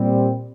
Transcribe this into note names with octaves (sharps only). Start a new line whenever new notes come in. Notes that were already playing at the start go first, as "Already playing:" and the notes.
Already playing: A#2 G3 C4